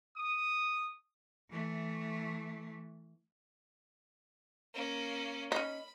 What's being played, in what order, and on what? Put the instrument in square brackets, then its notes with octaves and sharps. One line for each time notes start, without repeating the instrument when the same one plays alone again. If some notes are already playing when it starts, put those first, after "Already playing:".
[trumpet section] D#6
[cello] E3 A3
[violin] A#3 C#4
[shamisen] C#4 D#4 [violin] B5